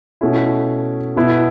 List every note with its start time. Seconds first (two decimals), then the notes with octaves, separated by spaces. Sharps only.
0.21 B2 A3 C#4 E4
1.16 B2 B3 E4